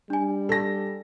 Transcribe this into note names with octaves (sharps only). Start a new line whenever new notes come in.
G3 D4 G#5
A4 A#6